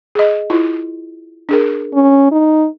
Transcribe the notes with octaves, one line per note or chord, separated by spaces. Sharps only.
G#4 D#5
E4 F4
D4 G#4 A#4
C#4
D#4